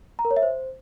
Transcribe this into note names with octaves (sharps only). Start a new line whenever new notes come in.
A#5
A#4
C#5
E5
C5